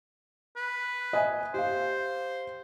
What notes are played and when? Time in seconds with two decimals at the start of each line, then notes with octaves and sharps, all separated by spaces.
0.56 B4
1.13 D#5 E5 G#5
1.54 G4 C5 F5